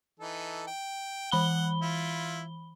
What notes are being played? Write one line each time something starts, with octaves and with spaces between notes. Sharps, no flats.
E3 D#4 A4
G5
E3 F#5 B5 G7
E4 F4